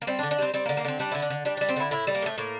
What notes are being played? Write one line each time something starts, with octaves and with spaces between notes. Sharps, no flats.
A#3
G3 C4
D4
D3
D4
G3 C4
G3 C4
A#3
D3
A#3
D3 C4
G3 D4
D3 E4
D4
D3
G3 D4
G3 D4
C4
D3 E4
A2 E4
G3
A#3
A2 A3
A2 A#3